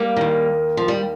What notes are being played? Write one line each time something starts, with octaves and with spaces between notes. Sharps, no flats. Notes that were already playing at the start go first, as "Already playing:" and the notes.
Already playing: G3 A#3
D#2 D#3
F3
G3